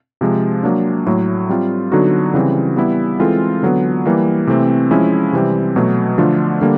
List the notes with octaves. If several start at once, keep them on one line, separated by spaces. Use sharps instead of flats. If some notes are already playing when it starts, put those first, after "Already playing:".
C3 F3 G#3
F#3 A#3 D4
A2 F#3 A3
G3 C4 F4
D3 F#3 B3 D#4 F#4
C#3 E3 G3 C4
G3 B3 E4
E3 G#3 C4 F4 A4
D3 F#3 B3
E3 G3 A#3
C3 E3 A3 C4
F3 G#3 C#4 E4
C3 E3 G3 C4
B2 F#3 A3
D3 F3 A3 D4 F4
D3 G3 A#3